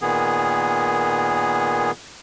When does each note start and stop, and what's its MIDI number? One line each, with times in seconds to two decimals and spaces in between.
0.02 1.91 46
0.02 1.91 51
0.02 1.91 59
0.02 1.91 68